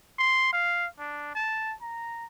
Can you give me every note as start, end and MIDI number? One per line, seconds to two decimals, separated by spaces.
0.19 0.51 84
0.53 0.86 77
0.99 1.32 62
1.35 1.74 81
1.82 2.26 82